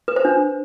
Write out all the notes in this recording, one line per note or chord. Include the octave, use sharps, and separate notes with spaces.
B4
C5
D4